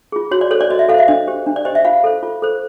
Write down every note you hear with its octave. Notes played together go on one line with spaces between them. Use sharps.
F4 G#4
F#4 C#5
D5
A4 C5 C#5
D5
F#4 D#5
E5
A4 F5
C5 E5
D4 D#5
G4 C5
D4
D5
G4 C5 D#5
E5
F4 F5
A4 C5
F4
A4 C5